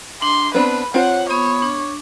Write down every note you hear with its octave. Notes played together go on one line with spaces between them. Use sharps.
D4 C6
B3 C4 D4 B4 B5
C4 F4 C5 C#5 F#5
B3 C#5 B5 D#6
D4